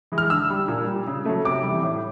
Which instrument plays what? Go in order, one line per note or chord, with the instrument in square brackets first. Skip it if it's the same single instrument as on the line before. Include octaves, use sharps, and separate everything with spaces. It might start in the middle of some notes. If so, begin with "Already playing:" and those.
[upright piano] E3 G#3
F6
D3 E6
G3
A#2
G3
C#3
F#3 A3
C3 D6
E3 G3
A2